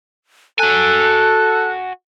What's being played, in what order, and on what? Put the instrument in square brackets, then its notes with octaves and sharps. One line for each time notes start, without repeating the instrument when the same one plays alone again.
[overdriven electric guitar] F#4 G#5 [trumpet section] A4 [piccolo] F#6